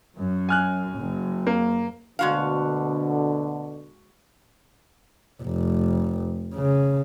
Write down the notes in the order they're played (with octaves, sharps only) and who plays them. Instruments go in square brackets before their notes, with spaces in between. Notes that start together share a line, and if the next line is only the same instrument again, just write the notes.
[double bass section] F#2
[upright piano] G#5 F6 F#6
[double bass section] F#1
[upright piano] A#3
[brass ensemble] D2 B2 D3 [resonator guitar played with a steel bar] G#3 F#4 F5
[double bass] F1
C#3